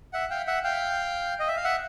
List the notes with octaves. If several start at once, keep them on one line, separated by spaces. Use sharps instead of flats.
E5 F#5
F5 G5
E5 F#5
F5 G5
D#5
E5
F5
E5 F#5